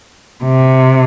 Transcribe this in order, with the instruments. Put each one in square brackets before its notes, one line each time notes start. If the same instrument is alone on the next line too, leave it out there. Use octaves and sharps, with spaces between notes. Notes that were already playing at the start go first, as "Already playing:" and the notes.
[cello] C3